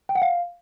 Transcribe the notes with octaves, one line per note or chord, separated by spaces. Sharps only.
G5
F#5
F5